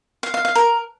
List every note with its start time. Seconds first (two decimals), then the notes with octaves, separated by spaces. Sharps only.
0.23 F5
0.34 F5
0.45 F5
0.55 A#4